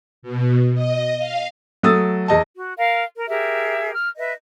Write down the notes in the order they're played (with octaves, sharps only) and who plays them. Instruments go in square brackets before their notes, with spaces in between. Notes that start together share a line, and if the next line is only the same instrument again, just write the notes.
[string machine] B2
D#5
F5
[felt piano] F#3 A3 D#6 E6 A6
E2 D#5 A5
[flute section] F#4
A#4 F5
A#4
G4 G#4 A#4 E5
F6
B4 D#5 E5